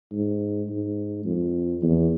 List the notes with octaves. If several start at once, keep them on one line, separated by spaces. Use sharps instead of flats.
G#2
G#2
F2
E2